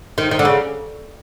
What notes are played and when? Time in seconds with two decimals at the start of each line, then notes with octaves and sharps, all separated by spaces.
0.18 D#3
0.31 D#3
0.39 D3
0.45 C#3